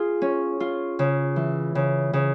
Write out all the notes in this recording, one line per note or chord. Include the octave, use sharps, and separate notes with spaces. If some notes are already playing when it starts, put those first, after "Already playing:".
Already playing: F4 G#4
C#4
F4
C#3
E3
C#3
C#3